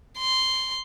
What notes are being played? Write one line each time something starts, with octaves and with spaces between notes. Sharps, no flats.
C6